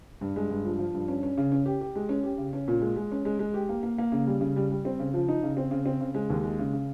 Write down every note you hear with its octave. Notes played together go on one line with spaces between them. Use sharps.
G2
G#3
G2
F3
F3
G2
C#4
C#4
C#3
C#4
G4
G4
G#3
C#4
G4
C#3
C#4
A#2
G#3
G#3
C#4
G#3
G#3
G4
A#3
A#3
A#3
C#3
G3
C#3
G3
G3
C4
C#3
F3
D#4
C#3
C4
C#3
C4
C#3
G#3
D#2
G#3
C#3
C#3